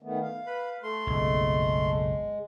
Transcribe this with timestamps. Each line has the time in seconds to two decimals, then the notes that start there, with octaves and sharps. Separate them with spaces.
0.03 D#3 A3 B3
0.21 F5
0.46 B4 B5
0.83 A3 C6
1.07 F#1 B1 G#3